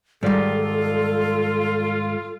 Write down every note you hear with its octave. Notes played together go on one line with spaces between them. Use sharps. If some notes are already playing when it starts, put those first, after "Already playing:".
G#2 D#3 G3 F4 A4 D5 B6